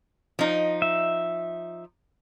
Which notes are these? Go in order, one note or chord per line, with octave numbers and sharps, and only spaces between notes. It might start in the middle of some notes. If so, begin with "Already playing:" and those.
F3 D#4
E5